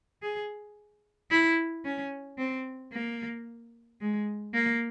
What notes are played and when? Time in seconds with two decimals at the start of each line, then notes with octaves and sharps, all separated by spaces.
0.22 G#4
1.31 E4
1.85 C#4
2.38 C4
2.93 A#3
4.01 G#3
4.54 A#3